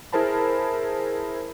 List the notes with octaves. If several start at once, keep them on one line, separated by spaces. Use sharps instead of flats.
E4 G#4 A#4 C5 A5 B5